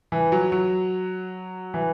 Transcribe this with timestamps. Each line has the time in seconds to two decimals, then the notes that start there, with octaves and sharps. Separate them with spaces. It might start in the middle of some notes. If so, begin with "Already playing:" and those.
0.12 E3
0.32 F#3
0.52 F#3
1.74 E3